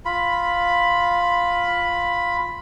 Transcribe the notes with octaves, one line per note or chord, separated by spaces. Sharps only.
F4 B5